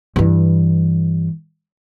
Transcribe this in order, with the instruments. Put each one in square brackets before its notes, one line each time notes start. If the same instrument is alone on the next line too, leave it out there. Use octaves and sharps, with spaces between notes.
[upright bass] G2 E3